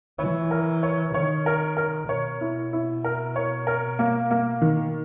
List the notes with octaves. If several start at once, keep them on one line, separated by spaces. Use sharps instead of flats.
E3 C#5
A#4
C#5
D#3 C#5
A#4
A#4
B2 C#5
E4
E4
A#4
C#5
A#4
A#3
A#3
D#3